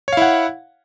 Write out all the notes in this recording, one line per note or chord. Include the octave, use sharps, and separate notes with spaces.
E4 C#5 F5 F#5